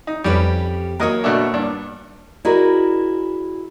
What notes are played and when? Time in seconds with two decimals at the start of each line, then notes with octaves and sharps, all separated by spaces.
0.07 D#4
0.24 F2 G3 C#4 G4 B4
1.00 F#3 A#3 A#4 C#5 D#5
1.24 B2 A3 D4
1.53 G2 D4
2.45 E4 F#4 G#4 A#4 D5 D#5